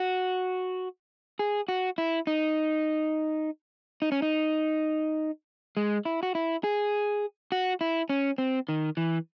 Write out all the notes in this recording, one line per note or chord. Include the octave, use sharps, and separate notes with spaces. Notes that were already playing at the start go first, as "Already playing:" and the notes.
Already playing: F#4
G#4
F#4
E4
D#4
D#4
C#4
D#4
G#3
E4
F#4
E4
G#4
F#4
E4
C#4
C4
D#3
E3